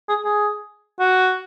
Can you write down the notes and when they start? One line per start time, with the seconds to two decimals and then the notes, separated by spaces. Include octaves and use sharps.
0.09 G#4
0.25 G#4
1.00 F#4